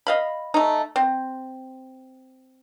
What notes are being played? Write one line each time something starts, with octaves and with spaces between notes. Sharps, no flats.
D#5 F5 B5
A3 D#4
C4